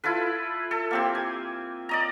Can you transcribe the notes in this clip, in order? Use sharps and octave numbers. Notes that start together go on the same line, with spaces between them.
E4 F4 A4 B4
A4
A#3 C4 G4
G#5
D5 D#5 A#5